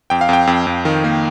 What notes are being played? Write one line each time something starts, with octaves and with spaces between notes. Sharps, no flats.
F2 G5
F5
F2 G5
F2
F2
D#3
A#3